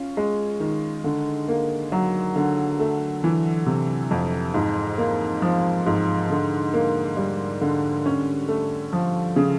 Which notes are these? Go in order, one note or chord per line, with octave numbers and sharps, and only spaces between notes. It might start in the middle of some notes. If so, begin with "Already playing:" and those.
Already playing: C#4 F4
G#3
D#3
D3
A#3
F#3
D3
A3
E3
C3
F2
G#2
A#3
F3
G#2
D3
A#3
G3
D3
C#4
A3
F3
C#3